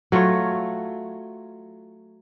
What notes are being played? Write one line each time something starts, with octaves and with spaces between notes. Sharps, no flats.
F#3 A3 F4 C#5